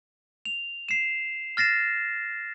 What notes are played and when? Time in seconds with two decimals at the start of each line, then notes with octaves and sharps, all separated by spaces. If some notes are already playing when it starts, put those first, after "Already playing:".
0.45 F7
0.89 C7 E7
1.57 F6 A6 A#6 C7 E7